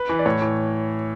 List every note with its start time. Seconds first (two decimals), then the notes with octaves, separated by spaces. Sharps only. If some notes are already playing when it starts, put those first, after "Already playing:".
Already playing: B4
0.09 E3
0.19 D5
0.26 A2 C#5
0.42 E3